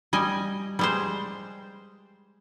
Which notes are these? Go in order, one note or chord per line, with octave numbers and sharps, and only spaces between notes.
G3 D#5 G#5
G3 G#3 C5